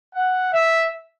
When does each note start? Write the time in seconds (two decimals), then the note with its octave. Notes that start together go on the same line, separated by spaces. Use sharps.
0.14 F#5
0.53 E5